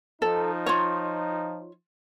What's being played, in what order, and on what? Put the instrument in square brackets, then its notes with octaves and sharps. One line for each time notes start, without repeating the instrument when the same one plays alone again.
[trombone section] F3 D#4 [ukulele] A4
[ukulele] F4 C#5